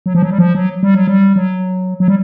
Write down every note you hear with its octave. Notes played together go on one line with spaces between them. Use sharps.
F#3
F3
F#3
G3
F3
F#3
G3
F#3
G3
F#3
F#3
G3